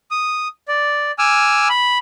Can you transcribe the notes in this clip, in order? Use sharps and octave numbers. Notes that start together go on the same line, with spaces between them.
D#6
D5
G#5 D6 E6 F6
B5